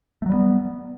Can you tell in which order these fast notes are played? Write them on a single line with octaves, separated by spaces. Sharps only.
A3 F#3 G3 B3